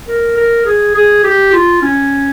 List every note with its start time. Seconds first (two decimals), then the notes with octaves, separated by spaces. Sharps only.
0.07 A#4
0.37 A#4
0.65 G#4
0.94 G#4
1.24 G4
1.53 F4
1.82 C#4